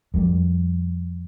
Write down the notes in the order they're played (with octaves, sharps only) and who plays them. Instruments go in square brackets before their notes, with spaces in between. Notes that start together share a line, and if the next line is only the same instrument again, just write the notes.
[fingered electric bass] F2 G3